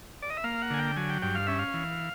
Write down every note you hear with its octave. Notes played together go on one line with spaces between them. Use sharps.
D5
D#5
E5
A#3 F5
F#5
D3 G#5
G5
F#3 G#5
G5
G2 G5
F5
C#4 E5
F5
E3